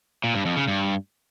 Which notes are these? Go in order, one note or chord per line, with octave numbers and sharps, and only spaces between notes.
A#2
G2
F2
C#3
G2